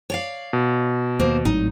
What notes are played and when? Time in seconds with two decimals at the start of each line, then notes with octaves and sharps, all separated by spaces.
0.10 C#5 D5 F5
0.53 B2
1.20 D#2 A#3 C5
1.45 G#1 A2 F#3 D#4